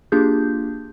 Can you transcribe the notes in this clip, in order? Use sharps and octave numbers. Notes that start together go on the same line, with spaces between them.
A#3 D4 F4 G4 G#4 G6